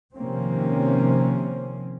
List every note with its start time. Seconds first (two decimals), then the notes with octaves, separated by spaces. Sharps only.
0.14 C3 D#3 F3 A#3 C4 C#4